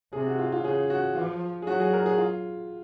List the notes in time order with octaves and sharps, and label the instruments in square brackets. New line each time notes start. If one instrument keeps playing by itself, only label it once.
[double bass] C3 [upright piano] G#4
[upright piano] F#4
F4
F4
[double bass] C#3 [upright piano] G#4
[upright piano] F#4
[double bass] F3 [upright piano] F4
[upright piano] G#4
[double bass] F#3 [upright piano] F#4
[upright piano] G#4
A#4
G#4
F4